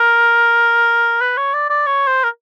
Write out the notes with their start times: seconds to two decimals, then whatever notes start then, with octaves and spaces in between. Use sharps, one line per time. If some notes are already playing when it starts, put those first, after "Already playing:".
Already playing: A#4
1.21 B4
1.37 C#5
1.54 D5
1.70 D5
1.87 C#5
2.07 C5
2.24 A#4